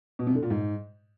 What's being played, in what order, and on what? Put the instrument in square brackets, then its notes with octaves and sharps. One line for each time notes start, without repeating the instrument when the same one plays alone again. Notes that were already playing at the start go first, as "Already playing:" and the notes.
[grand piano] B2
C3
D3
A#2
G#2